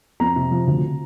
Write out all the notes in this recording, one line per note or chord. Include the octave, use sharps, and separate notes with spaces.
F2 A#5
C3
F3
D2